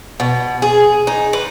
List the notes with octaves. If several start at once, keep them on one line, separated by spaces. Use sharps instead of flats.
B2
G#4
D#4
B4